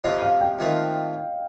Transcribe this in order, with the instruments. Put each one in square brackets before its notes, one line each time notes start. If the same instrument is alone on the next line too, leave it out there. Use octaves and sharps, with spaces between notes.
[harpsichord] F2 C3 F3 C4 F4 [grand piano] D#5
[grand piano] F5
G5
[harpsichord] F2 D#3 A3 C4 F4